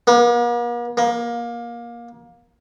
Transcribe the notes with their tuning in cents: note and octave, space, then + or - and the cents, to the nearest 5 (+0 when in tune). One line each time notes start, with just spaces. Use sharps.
A#3 +45
A#3 +20